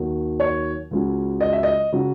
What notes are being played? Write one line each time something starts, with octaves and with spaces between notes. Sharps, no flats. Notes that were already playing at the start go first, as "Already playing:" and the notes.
Already playing: D#2 D#3 F#3
C#5
C#2 C#3 F#3
D#5
E5
D#5
C#3 F#3